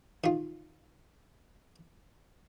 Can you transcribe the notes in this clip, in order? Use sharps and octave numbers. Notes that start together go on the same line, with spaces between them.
D#3 F4